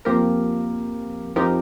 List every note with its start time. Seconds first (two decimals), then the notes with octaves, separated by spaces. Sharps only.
0.05 F2 F3 A#3 G4 A#4
1.36 F2 F3 D#4 G4 A#4